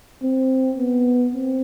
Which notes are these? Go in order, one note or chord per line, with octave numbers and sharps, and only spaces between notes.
C4
B3
C4